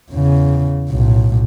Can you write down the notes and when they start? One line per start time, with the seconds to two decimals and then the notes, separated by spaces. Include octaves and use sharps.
0.11 E2 C#3
0.90 B1 A2